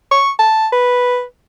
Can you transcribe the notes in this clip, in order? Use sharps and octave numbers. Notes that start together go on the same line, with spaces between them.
C#6
A5
B4